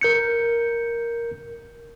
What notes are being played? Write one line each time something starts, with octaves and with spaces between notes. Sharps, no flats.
A#4 G6 C#7